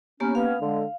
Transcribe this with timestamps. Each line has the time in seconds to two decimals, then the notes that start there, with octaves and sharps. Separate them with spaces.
0.20 A#3 B3 C#4 G4
0.35 B3 C#4 F5
0.61 D3 G#3